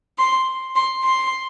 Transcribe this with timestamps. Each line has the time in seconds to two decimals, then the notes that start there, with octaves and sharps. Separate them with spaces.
0.18 C6
0.75 C6
1.04 C6